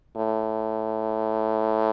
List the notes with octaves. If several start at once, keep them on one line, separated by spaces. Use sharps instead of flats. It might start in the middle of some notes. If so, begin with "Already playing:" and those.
A2